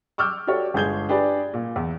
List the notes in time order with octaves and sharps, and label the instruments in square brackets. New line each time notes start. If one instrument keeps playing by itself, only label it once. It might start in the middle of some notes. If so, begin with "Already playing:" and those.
[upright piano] C#6 D6 E6 F6 G6
F#4 G4 A4 C#5 D5
G1 G#3 G#4 G6 G#6 G7
D4 G4 G#4 B4 D5
A#2
E2